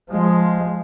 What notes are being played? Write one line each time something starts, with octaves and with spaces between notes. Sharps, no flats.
F3 G#3